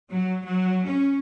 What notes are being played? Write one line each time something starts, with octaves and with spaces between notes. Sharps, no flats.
F#3
F#3
C#4